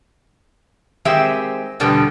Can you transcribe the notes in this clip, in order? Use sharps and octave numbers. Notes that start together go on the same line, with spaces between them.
D#3 G#3 C4 G4 E5
E2 B2 D3 G3 B3